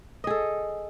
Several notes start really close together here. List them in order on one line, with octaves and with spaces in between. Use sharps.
D#5 G#4 A4